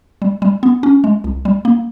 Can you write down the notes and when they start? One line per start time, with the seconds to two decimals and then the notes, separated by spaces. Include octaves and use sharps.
0.22 G3
0.42 G3
0.63 B3
0.83 C#4
1.04 G#3
1.24 C2
1.45 G3
1.65 A#3